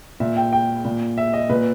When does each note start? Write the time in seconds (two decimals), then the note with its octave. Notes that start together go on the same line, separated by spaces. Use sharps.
0.20 A#2 E5
0.37 G5
0.53 G5
0.85 A#2
1.18 E5
1.33 D#5
1.50 A#2 B4